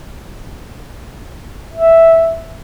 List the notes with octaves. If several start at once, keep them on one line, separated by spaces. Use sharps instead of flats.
E5